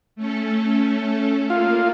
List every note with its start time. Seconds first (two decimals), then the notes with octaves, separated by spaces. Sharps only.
0.16 A3 C#4 A4
1.50 A#3 F4